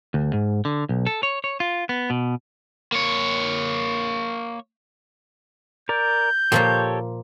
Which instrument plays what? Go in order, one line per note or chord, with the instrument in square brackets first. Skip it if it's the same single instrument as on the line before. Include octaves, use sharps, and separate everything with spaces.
[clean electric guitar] D2
G#2
D3
B1
A4
C#5
C#5
F4
B3
B2
[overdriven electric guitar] A#3 C#5
[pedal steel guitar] A#4 D5 [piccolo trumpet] G6
[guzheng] A#2 F3 A#3 [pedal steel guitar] G4 A4 C#5